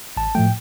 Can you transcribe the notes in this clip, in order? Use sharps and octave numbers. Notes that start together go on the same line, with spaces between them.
A1 A5
A2 F3 A3 G5